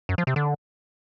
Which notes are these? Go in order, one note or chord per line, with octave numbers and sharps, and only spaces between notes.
F#2
F3
C3
D3